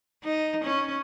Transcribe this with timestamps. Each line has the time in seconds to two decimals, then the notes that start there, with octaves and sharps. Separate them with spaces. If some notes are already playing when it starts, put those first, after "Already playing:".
0.24 D#4
0.64 C#4